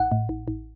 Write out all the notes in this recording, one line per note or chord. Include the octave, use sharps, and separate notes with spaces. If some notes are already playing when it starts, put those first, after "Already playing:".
Already playing: A1 F#5
A2
A1
A1